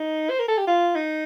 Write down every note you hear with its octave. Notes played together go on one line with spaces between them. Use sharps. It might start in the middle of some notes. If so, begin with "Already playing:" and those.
Already playing: D#4
C5
A#4
A4
G4
F4
D#4